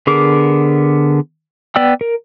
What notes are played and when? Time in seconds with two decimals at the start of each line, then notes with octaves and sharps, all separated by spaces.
0.07 D3 B3 G#4 A#4 D6
1.76 B3 D5 G5 E6
2.01 A#4